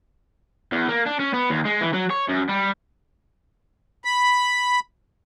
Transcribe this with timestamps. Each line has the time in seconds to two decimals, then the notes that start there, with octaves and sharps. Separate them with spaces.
0.72 E2
0.89 A#3
1.06 D4
1.20 C#4
1.34 B3
1.50 D#2
1.65 G#3
1.81 E3
1.94 F#3
2.10 C#5
2.28 F#2
2.49 G3
4.05 B5